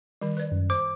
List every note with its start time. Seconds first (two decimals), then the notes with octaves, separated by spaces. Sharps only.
0.21 D#3 G3
0.37 B4 D5
0.52 F#2
0.70 C5 D6